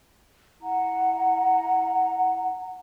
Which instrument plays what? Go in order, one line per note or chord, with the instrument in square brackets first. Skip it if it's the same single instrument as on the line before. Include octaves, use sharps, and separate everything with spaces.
[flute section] E4 F#5 A#5